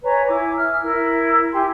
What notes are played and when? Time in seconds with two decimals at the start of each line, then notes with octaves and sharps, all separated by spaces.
0.02 B4 C#5 G#5 A#5
0.27 E4 G#5 D6
0.56 E5 F6
0.81 E4 A#4
1.52 E4 G4 G#5 C6